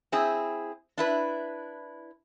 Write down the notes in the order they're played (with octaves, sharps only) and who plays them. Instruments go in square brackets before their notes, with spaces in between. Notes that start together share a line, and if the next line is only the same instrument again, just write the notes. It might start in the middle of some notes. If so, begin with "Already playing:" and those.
[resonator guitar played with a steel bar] C4 E4 G#4
D4 E4 B4